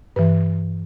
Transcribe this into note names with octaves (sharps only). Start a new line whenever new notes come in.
G2 E3 B4